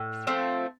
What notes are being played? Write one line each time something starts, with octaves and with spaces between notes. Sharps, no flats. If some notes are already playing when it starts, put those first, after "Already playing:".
Already playing: A2
F3 A3 C4